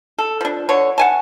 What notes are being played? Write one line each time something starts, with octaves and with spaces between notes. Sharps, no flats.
A4
F3 D4
D3 A4 C#5
F#5 G#5 A5